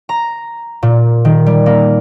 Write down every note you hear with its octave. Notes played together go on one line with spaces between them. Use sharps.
A#5
A#2
D#3
G3
A#3